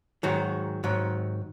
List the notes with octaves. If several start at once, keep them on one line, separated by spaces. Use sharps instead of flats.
G#2 D#3 F#3 F#4
G#2 D#3 F#3